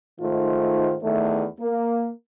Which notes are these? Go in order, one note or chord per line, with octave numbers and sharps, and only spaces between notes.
G#2 D#3 A3 F4 C5
E2 D#3 A3
A#3